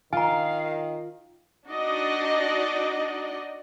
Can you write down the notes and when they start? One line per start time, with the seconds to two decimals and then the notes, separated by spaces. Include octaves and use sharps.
0.13 D#3 F4 F5 G#5 A#5
1.68 D4 D#4 F#4 D5 D#5